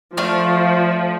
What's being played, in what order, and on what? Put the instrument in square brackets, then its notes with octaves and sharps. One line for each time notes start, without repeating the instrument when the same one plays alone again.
[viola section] F3 [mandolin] A3 D4 F6